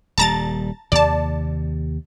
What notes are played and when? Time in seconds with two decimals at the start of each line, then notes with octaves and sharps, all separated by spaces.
0.18 D#1 G3 A5 A#5 A6
0.92 D#2 C3 D5 A5